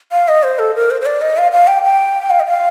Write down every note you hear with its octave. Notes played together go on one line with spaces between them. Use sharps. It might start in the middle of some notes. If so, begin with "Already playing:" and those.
F5
D#5
C5
A4
A#4
C5
C5
D5
D#5
F5
F5
G5
G5
F5
D#5
F5